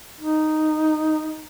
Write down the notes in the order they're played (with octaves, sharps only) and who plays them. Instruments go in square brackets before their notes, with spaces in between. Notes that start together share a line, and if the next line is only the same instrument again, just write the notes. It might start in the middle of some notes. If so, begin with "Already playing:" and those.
[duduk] D#4